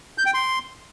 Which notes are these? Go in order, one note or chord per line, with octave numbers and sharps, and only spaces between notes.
G6
G5
C6